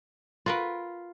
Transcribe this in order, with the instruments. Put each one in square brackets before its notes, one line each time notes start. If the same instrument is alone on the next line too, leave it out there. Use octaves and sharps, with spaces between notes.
[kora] F4 [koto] F#4 A#4 B4